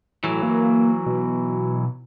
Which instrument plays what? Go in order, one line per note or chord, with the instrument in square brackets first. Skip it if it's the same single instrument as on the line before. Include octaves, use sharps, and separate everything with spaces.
[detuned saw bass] A2 [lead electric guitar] E3 F#3
[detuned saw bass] A#3
B2